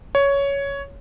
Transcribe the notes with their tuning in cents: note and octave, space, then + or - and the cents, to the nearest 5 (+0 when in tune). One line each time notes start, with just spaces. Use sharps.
C#5 +10